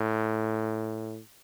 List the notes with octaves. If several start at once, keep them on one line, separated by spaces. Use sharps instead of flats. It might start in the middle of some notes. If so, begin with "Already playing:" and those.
Already playing: A2